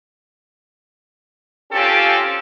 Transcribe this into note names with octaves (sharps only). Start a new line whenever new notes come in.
C4 C#4 F4 G4 A4